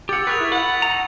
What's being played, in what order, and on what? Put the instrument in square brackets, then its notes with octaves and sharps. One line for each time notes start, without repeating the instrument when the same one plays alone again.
[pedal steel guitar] G4 F#5 [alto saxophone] G5 [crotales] E6 A6
[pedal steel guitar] G#4 A#4 B4 [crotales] C#6 A6 F7
[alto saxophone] E4
[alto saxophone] F#5 [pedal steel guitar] B5
[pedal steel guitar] D#4 A#5